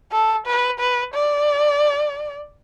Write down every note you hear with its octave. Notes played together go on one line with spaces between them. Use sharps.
A4
B4
B4
D5